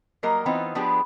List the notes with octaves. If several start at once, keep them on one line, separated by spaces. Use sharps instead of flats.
F#3 G3 A#3 A#4 D#5
E3 B3 C4 D#4 F4
F3 B3 D4 G4 G#4 B4